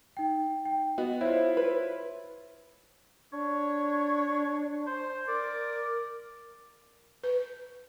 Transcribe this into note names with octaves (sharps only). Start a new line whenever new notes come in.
D#4 G5
G5
B3 F#4 D#5
E4 F4 C5 C#5 E5
B4
D4 C#5
C5
A#4 D5
B4